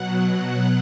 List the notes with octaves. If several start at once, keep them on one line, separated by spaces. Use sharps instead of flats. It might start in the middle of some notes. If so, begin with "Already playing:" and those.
Already playing: B2 F#3 F#5